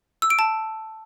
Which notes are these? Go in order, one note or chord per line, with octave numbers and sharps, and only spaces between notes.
E6
D7
A5